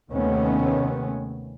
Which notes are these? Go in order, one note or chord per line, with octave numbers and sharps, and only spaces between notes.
D#2 C3 D#3 A3 B3 C#4